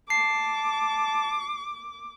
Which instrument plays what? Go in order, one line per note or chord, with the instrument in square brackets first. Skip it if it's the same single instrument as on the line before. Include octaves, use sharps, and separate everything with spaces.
[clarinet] A5 [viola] D6 [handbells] C7